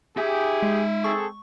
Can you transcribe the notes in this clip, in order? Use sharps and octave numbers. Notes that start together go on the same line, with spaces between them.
D#4 G4 G#4 E5
G#3
C4 G#4 A4 C#6